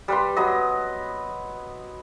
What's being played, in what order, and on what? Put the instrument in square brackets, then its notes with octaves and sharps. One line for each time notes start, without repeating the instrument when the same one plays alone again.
[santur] G3 B4 C6
F#3 B3 D#5